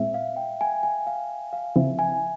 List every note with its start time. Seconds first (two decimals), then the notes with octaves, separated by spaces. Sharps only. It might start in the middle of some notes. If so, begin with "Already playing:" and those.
Already playing: A#2 G#3 C4 E4 E5
0.14 F5
0.36 G5
0.61 G#5
0.83 G#5
1.07 F5
1.53 F5
1.76 C#3 F3 C4 E4 E5
1.99 G#5